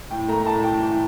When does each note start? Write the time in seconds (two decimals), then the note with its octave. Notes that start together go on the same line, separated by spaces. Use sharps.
0.11 A2 G5
0.28 A3 A#5
0.46 A2 A5
0.64 A2 G5
0.81 E3